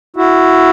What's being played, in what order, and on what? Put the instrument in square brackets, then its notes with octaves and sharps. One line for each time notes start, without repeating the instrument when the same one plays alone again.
[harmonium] E4 F#4